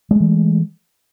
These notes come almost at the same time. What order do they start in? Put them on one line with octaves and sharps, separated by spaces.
G#3 A3 E3